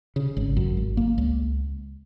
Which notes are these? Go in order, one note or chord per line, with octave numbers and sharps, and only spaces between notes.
C#3
G#1
F#2
G#1
A#3
C#2